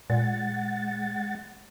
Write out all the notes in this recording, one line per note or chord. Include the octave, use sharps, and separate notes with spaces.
A#2 G#3 F#5 A6